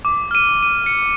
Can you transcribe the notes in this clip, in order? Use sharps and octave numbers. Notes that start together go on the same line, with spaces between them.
D6
F6 D#7
D#7
C#7